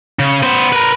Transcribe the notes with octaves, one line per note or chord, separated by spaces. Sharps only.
C#3
B3 C5
A#4 B4